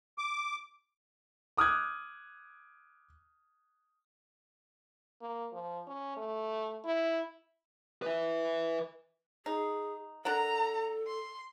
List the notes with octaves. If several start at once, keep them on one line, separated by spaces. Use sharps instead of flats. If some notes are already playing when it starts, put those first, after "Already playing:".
D6
D6 D#6 F6 F#6 G#6
A#3
F3
C#4
A3
E4
B4 E5
D#4 G#4
D4 A4 A#4 F#5 A#5
C6